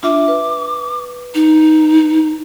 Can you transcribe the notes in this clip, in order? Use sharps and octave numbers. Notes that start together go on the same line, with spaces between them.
D4 F4 E5 D6
B4
D#4